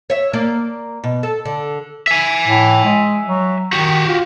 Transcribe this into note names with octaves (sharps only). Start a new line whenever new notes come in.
C#5 E5
A#3 D5
B2
A4
D3
E5 G#5
A2
G#3
F#3
D#3 F#4 G4
F4